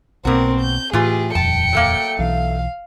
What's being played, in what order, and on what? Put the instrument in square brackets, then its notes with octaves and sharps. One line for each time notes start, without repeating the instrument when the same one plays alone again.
[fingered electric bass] B1 B2 A#3 [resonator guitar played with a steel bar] G2 F#4 [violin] C4 A#4
[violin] G6
[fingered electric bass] A2 [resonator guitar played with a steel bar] E3 F4 [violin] G4 G#4
[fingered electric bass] D#1 F2 [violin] G5 C#7 [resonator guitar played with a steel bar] A5
[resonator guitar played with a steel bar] F#3 A3 A#3
[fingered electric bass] B1 E3 [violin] F5